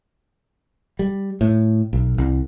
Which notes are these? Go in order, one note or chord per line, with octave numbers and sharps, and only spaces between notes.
G3
A2
B1
C2